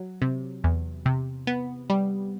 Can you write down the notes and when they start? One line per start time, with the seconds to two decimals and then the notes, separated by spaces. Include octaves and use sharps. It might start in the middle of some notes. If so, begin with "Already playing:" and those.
Already playing: F#3
0.22 C3
0.64 E2
1.06 C3
1.47 B3
1.90 G3